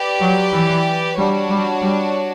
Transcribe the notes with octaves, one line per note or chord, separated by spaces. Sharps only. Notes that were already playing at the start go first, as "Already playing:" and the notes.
Already playing: G4 B4 D5
F#3
E3
G3 D4 F#4 C#5
G3
G3